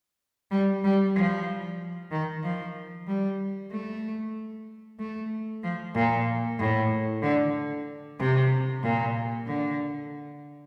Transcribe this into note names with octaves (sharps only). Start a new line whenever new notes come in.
G3
G3
F3
D#3
F3
G3
A3
A3
F3
A#2
A2
D3
C3
A#2
D3